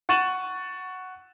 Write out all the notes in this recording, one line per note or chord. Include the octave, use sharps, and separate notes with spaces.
F#5 C#6 A6 D#7 E7 F#7